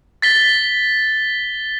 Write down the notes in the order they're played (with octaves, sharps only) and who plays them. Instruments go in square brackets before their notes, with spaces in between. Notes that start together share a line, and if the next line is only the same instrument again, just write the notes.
[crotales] A6 B6 G7